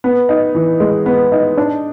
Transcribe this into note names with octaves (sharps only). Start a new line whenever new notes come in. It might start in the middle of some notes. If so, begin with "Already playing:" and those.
B3
D#4
E3
G#3
B3
D#4
D4